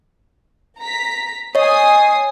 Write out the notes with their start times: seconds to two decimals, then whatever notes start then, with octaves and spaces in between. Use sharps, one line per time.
0.79 A#5 B6
1.55 C#5 D#5 G#5 D#6 C7